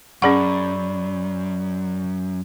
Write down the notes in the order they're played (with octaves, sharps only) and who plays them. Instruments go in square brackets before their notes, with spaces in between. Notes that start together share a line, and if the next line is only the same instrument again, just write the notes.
[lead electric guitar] F#2 [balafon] C#4 G#4 F#5 [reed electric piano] D5 B5 C#6